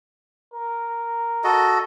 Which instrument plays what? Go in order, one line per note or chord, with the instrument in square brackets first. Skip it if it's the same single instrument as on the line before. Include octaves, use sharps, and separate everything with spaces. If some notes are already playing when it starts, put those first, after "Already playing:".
[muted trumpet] A#4
[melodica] F#4 A4 D#5